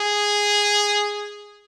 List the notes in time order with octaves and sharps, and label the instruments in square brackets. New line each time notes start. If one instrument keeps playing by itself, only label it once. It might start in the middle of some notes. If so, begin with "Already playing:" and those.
Already playing: [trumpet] G#4